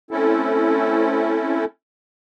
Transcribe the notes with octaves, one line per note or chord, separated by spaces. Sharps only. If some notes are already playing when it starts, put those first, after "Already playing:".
A3 C4 C#4 E4 A4